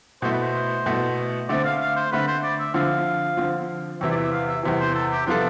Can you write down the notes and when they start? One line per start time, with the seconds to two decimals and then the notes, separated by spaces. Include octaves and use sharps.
0.22 B2 A3 E4 C5
0.32 B4
0.42 C5
0.86 B2 A3 E4
1.48 D3 A3 C4 D5
1.64 F5
1.80 F5
1.96 C5
2.11 D3 A3 C4 B4
2.27 C5
2.43 D5
2.59 E5
2.74 D3 F3 C4 F5
3.37 D3 F3 C4
4.01 E2 C3 E3 E5
4.11 D5
4.16 E5
4.32 F5
4.48 E5
4.63 E2 C3 E3
4.80 C5
4.95 A4
5.11 G4
5.27 C3 F3 B3 D4 F4 A4